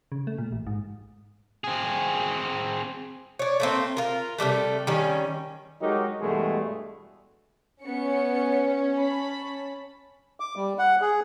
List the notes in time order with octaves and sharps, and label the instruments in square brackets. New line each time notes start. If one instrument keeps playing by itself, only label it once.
[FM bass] C#3
A3
A#2
A1
G#2
[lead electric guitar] C4 G#4
[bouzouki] C#5 D5
A3 A#3 C4
F4 A#4
C3 E3 G3 A3
D#3 G3 C#4
[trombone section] F#3 G#3 D#4 F#4 G4 A#4
E2 G2 B2 E3 G#3 A3
[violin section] B3 C#7 [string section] C#4
[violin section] A5 B5
[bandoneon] D6
G3
F#5
G#4